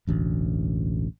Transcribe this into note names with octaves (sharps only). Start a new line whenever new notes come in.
E1 A1 D2